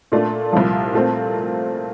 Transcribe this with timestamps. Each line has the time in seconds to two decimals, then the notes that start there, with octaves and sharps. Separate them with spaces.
0.12 A#2 A3 D4
0.53 C2 A#2 F3
0.93 A#2 A3 C4